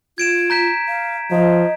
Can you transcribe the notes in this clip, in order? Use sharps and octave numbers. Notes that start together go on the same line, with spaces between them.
F4 G#6 D7 E7
A#5 G6 B6
F5
F3 D#5